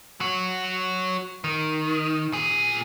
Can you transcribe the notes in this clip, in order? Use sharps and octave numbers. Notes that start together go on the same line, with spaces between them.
F#3 F#4
D#3
A#2 G#4